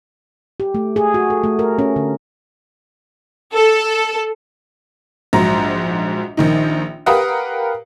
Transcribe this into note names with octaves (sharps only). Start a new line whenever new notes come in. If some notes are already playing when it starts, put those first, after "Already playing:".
G4
A3
G#4
F#4
A4
A3
A#4
C#4
D3
A4
A#1 G#2 F#3 A#5
A#1 D#3 D#4
G4 A#4 B4 F5 F#5 D#6